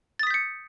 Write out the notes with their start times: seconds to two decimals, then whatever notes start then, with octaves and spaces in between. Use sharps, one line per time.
0.19 A6
0.23 D#6
0.27 B6
0.30 G6
0.34 C#7